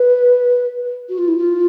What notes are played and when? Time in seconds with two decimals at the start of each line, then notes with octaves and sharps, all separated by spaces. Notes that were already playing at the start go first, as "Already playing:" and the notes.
Already playing: B4
1.09 F#4
1.18 F4
1.28 E4
1.38 F4